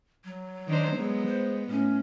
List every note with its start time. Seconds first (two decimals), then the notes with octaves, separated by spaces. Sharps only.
0.25 F#3
0.68 D#3 D4 C5
0.96 G#3 B3
1.26 C5
1.70 A2 C#4